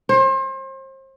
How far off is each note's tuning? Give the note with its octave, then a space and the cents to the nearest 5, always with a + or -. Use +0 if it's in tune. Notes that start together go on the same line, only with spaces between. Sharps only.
C5 +35